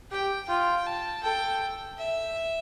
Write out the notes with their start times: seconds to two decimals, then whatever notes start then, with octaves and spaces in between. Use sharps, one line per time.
0.11 G4 G5
0.48 F4 G5
0.86 A5
1.23 A4 G5
1.98 E5